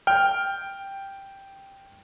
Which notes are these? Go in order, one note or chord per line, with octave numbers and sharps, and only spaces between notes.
G5 F6